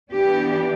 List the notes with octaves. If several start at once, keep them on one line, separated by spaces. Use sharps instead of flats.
E3 B3 D4 G4